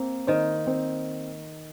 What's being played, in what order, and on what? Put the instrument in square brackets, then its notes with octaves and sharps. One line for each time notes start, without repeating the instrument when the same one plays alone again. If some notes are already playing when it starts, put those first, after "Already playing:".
Already playing: [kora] A#3 [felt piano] C4
[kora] D#3 [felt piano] C5
[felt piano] C4